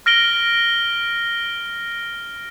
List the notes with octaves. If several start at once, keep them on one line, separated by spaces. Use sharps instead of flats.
F6 A#6 D7 G7